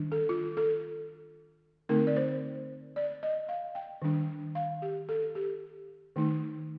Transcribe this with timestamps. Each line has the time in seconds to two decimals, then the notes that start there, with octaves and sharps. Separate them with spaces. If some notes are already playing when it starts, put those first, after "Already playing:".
Already playing: D#3 G3 D4
0.12 A4
0.29 F4
0.57 A4
1.89 D3 A3 C4 D#4 A#4
2.07 D5
2.17 C5
2.96 D5
3.23 D#5
3.49 F5
3.75 G5
4.02 D#3 G3 D4
4.55 F5
4.82 G4
5.09 A4
5.35 G4
6.16 D#3 A3 D#4